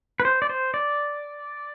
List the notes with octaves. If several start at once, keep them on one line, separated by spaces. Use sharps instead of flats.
B4
C5
D5
C5
D5